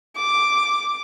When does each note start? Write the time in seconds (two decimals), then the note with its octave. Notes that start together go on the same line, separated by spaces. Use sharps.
0.17 D6